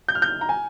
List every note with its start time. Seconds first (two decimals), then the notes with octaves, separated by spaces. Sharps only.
0.08 G6
0.15 F6
0.22 G6
0.41 A#5
0.49 G#5